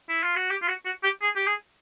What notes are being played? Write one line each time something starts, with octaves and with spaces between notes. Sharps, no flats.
E4
F4
F#4
G4
F4
F#4
F#4
G4
G#4
G4
G#4